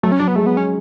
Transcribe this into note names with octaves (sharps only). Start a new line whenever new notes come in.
F#3 A3
C#4
F#3 D4
B3
G#3 A3
B3
C#4